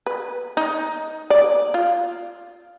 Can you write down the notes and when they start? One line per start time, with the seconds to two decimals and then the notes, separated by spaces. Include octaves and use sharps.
0.06 B4
0.57 D#4
1.30 D5
1.74 F4